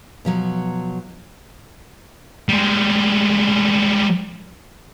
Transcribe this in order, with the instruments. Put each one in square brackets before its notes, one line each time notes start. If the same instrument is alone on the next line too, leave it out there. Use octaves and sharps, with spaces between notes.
[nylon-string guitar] B2 F3 F#3
[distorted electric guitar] G3 G#3